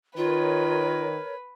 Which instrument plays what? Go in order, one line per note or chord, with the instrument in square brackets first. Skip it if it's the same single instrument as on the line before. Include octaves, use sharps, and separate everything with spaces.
[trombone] D#3 [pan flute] F4 [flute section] A#4 C#5 [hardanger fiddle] B4